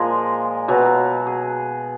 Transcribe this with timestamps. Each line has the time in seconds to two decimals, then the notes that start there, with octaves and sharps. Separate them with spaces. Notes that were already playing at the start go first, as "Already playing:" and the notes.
Already playing: A#2 F3 G#3 G#4 A#4
0.68 B2 F#3 B4
1.27 G#4